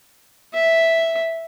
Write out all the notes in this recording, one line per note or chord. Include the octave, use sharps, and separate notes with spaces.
E5